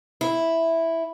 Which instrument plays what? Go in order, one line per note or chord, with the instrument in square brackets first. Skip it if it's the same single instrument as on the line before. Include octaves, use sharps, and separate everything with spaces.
[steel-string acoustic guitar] E4